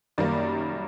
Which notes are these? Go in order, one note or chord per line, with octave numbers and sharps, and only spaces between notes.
F#2 D#3 G3 A#3 D5